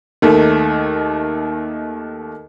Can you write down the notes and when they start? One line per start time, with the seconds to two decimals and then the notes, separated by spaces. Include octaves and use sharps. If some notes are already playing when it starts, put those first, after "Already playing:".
0.22 D#2 D#3 A3